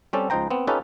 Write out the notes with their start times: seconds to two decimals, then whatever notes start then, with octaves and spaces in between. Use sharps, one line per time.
0.13 G3 C4 C#4 G4 A4
0.30 C#2 F3 D#4 C5 G5 A#5
0.50 B3 C4
0.67 C#4 D#4 F4 G4 A4 B4